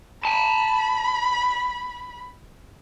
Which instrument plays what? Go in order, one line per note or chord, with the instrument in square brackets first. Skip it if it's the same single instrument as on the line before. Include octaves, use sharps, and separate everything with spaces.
[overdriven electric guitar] G#5 A5 [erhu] B5